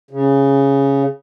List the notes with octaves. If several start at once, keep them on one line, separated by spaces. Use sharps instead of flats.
C#3